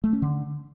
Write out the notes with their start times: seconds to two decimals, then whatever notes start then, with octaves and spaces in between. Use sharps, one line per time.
0.04 A3
0.13 C#4
0.22 D3